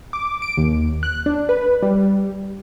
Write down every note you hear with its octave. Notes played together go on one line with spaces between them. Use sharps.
D6
D7
D#2
F#6
D4
B4
G3